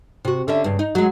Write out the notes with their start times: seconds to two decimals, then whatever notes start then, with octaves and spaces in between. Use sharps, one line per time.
0.25 C3 F#4
0.48 D3 C#4 E5
0.64 G2 C#3
0.79 D#4
0.95 F#3 G#3